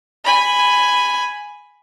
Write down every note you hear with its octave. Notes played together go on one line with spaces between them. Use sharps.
G#5 B5